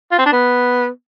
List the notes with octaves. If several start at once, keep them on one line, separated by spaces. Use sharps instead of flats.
F4
C4
D4
B3